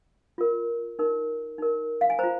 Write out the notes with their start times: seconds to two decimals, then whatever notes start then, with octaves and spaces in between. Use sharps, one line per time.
0.38 F4 A#4
0.99 D#4 A#4
1.58 D#4 A#4
2.01 F5
2.10 G#5
2.19 F4 C5 A#5